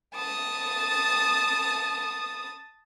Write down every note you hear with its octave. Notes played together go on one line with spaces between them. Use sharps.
A5 D#6